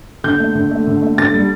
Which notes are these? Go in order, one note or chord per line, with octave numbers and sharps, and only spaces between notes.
D3 G6
A3
D3
A3
D3
A3
D3 A6
G3